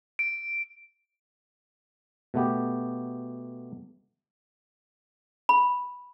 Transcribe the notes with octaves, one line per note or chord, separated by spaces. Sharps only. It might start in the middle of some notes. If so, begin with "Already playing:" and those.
D7
B2 A3 B3 G4
B5